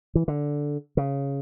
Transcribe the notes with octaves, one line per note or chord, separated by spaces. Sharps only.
E3
D3
C#3